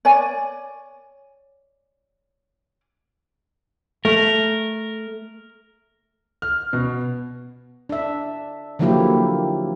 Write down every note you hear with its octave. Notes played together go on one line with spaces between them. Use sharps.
C#5 D5 G#5
A3 A#4
F6
B2
D4 E5
D3 F3 F#3 A#3 E4 G4